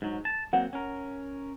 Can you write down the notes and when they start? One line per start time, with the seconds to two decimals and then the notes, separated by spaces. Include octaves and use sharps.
0.02 G#2 F#3
0.25 A5
0.53 F#3 A#3 C4 F#5
0.73 C#4 A#4